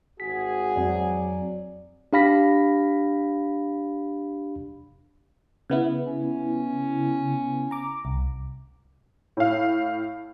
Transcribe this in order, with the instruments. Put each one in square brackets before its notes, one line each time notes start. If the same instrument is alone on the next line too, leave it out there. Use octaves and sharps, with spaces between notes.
[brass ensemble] G#1 F#4 G#4 [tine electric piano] B6
[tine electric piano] F2 C4 G#5 [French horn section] F#3 D5
[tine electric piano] D4 G4 F5 B5 A#6 B6
[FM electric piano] C#3 B3 E4
[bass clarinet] C#4
[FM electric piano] A#5 D6
C2
[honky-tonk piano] A2 F5